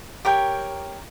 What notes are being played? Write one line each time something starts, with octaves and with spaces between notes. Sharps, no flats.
G4 A#4 C#5 G5